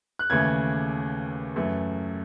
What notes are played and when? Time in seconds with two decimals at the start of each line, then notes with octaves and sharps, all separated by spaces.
0.19 F#6
0.30 D#2 C#3 E3 A3 G#6
1.56 F#2 E3 A3